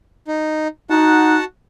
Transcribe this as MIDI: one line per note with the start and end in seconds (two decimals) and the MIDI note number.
0.28 0.68 63
0.90 1.38 63
0.90 1.44 66
0.90 1.44 78
0.90 1.44 81